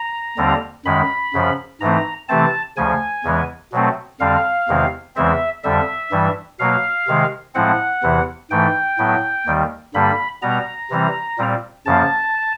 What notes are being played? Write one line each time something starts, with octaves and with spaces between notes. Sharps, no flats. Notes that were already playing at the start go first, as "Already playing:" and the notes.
Already playing: A#5
D#2 D3 G3 C4
F#2 D#3 G#3 B5
F#2 C#3 F3
G#2 E3 A3 C4 A#5
C3 E3 A3 C4 A5
D2 C#3 F3 G#5
E2 C#3 E3 G#3 B3
B2 F#3 A3 C4
F2 D3 G3 C4 F5
E2 C3 D#3 G#3 C4
E2 C#3 E3 G#3 C4 E5
F2 D3 G3 E5
G2 E3 G3
B2 F#3 A#3 F5
C3 D#3 G#3
A2 F3 G#3 C4 F#5
E2 C3 E3
G#2 E3 A3 G5
A2 F#3 B3
D#2 D#3 G3
G2 D3 G3 A#3 B5
B2 G3 B3 A#5
C3 E3 G3 C4
A#2 G3 C4
F#2 C#3 F3 A#3 A5